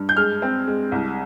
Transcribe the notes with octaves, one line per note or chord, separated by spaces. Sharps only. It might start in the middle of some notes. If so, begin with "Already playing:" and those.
Already playing: G2
G6
G#3 F6
C4
G#3
C2